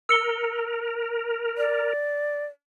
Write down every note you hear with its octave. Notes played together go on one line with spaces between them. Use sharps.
A#4 E6 C#7 G7
D5